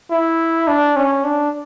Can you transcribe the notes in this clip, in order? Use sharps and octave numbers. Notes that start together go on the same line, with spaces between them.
E4
D4
C#4
D4